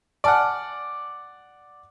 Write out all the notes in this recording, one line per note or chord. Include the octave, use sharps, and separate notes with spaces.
D5 F#5 G#5 A5 F6